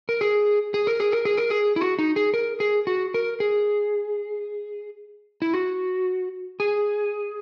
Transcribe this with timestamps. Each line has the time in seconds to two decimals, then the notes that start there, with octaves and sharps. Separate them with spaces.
0.09 A#4
0.21 G#4
0.74 G#4
0.87 A#4
1.00 G#4
1.12 A#4
1.25 G#4
1.37 A#4
1.50 G#4
1.76 E4
1.81 F#4
1.99 D#4
2.16 G#4
2.34 A#4
2.60 G#4
2.87 F#4
3.14 A#4
3.40 G#4
5.42 E4
5.53 F#4
6.60 G#4